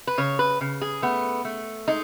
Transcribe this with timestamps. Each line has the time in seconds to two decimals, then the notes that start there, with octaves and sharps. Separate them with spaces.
0.07 B4
0.18 C#3 C#5
0.39 B4
0.61 C#3
0.82 G#4
1.02 A3 B3
1.45 A3
1.88 G#3 D#4